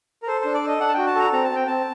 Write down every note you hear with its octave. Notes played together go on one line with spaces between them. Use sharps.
A#4
A4 C5
D4 C5
D5
A4 D#5
D4 F#5
A5
F#4 G5
A5
A4 A#5
C4 A#5
A5
C4 G5
C4 A5